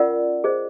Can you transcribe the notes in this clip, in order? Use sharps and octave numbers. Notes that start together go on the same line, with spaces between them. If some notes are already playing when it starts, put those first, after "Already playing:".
Already playing: C#4 F4 A#4 D5 F#5
G#4 C5 D#5